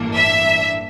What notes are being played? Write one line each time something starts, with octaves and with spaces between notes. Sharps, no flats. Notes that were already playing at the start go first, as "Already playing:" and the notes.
Already playing: A1 G2 E3 A#3 D4
E5